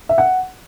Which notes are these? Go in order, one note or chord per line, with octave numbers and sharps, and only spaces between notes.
E5
F#5